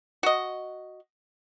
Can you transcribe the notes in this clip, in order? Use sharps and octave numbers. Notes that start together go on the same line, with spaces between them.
F#4 D#5